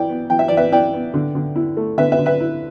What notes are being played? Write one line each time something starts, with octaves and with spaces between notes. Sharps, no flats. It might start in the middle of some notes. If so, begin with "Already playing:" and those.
Already playing: E3 E4 D5 G5
B3
E3 G5
E5
E3 D5
B4 E5
E4 D5 G5
B3
D3
D3
E4
A3
D3 B4 E5
B4 E5
D3
B4 E5
E4